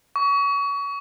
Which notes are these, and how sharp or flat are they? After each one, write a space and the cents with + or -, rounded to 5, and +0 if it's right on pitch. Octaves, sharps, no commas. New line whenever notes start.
C#6 +30